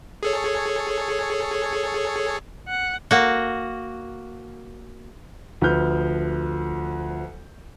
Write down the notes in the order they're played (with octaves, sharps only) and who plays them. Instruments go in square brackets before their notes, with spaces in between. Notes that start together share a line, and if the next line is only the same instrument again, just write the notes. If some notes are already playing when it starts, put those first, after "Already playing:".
[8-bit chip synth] G#4 A4 C#5
[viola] F#5
[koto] A#3 F#4
[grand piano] D2 F3 B4 F6 G6